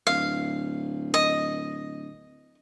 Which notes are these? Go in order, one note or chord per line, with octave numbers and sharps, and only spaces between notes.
D1 F5
D#5